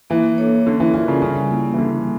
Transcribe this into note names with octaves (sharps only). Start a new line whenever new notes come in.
E3 A#3
D4 A4 C#5
D3 C#4
E3
E3 F4 A#4 D5
C#3
C#3 G3
A#3 C#4 E4 G4
E3
D3 G3